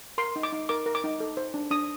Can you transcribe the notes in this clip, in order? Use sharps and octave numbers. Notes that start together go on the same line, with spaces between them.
A#4 C6
D#4
D6
D#4
A#4 D6
A#4
D6
D#4
A4
C5
D4
D4 D#6